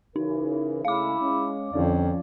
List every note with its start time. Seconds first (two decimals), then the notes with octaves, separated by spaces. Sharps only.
0.16 C#3 E3 D#4 A#4
0.85 C#3 G#3 A3 E4 F5 D6
1.20 G#3 C#4
1.73 F2 D3 F3 C#4 D5